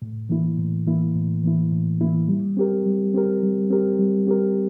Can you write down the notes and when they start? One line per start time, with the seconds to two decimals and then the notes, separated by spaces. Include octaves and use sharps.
0.02 A2
0.29 E3 A#3 E4
0.58 A2
0.86 E3 A#3 E4
1.16 A2
1.43 E3 A#3 E4
1.72 A2
2.01 E3 A#3 E4
2.28 G3
2.57 C4 G4 A#4
2.86 G3
3.14 C4 G4 A#4
3.43 G3
3.70 C4 G4 A#4
3.99 G3
4.27 C4 G4 A#4